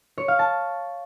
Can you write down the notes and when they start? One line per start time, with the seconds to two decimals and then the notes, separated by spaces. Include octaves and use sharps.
0.18 C#5
0.28 F5
0.39 A5